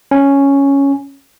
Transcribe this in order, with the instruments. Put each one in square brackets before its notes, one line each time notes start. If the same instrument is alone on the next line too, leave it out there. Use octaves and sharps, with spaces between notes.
[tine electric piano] C#4